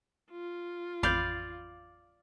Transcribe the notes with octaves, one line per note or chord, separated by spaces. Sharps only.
F4
A1 F2 D5 F5 B5 D6 G6